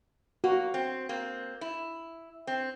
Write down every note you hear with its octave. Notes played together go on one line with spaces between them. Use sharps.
A#3 F#4
C4
A#3 C4
E4
C4